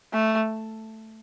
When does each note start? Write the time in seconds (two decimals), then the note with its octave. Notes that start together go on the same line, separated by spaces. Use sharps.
0.13 A3